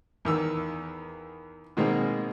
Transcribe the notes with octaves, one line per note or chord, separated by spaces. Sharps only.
E2 D#3 E6
B2 D#3 G#3 A#3 C4